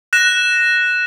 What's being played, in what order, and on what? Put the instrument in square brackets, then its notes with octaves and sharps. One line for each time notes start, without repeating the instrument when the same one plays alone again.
[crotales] F#6 A#6 E7